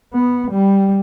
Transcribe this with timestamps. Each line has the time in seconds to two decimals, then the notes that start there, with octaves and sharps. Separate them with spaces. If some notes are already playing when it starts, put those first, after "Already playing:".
0.14 B3
0.52 G3